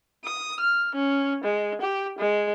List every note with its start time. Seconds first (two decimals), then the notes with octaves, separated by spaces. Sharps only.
0.25 D#6
0.60 F6
0.95 C#4
1.44 G#3
1.81 G4
2.19 G#3